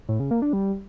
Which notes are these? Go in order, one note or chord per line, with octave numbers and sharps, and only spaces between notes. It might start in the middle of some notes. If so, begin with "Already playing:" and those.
A2
C#3
A#3
D4
G3